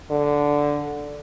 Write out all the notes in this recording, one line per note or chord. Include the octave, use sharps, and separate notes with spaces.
D3